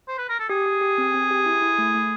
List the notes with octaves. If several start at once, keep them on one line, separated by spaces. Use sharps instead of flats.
C5
B4
A#4
A4
G4 G#4
G4
G4
C4
C4
G4
E4
E4
A3
A3